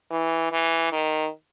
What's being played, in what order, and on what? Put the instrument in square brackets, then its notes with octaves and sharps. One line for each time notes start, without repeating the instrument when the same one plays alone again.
[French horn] E3
E3
D#3